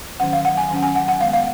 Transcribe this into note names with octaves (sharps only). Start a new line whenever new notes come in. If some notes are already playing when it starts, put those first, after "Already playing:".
D#3 F#3 C#4 F#5
F5
F#5
G#5
D#3 F#3 C#4
G#5
F#5
F#5
D#3 G#3 B3 F5
F5